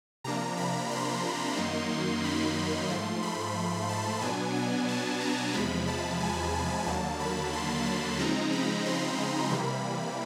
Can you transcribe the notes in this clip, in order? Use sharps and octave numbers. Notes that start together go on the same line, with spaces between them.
C3 F3 A#3 D4 A#5
B5
C6
F#2 D#3 F#3 A#3 D#4
B5
G#2 F3 A3 C6
B5
A5
B2 F#3 B3 D4 G#5
G#5
A5
A#5
E2 C3 F3 G#3 B5
A5
G#5
D#2 D3 F#3 A#3 A5
B5
C6
B5
C#3 F3 G#3 C4 D#4 A#5
B5
C6
C3 E3 G3 A#3 B5